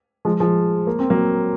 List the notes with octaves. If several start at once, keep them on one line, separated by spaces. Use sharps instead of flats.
F3 G#3
F3 G#3
A#3
C4
F#3 A#3